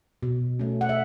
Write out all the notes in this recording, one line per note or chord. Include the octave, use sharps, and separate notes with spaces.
B2
A3 C#4
F#5
E5